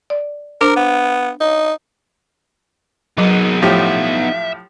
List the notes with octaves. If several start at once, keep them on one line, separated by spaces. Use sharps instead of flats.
D5
D4 A#4 C5 A#5
B3
D#4
F#3 B3 D#4 G#4 A#4
A2 F3 G4 E5